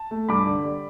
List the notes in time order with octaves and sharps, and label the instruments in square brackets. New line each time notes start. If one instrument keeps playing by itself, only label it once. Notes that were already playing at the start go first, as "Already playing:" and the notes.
Already playing: [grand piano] A5
A3
G2 B5 D6
D3
G3